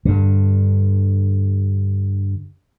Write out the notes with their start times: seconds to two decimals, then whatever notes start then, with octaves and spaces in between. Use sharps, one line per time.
0.05 G2 D3